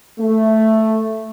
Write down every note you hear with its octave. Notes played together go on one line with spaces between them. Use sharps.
A3